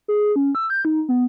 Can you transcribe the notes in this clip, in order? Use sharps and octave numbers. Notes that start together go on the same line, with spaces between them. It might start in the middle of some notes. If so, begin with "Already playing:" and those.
G#4
C#4
E6
G6
D#4
B3